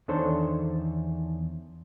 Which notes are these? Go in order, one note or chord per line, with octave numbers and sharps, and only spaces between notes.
E2 D#3 D4 A4 C5 C#5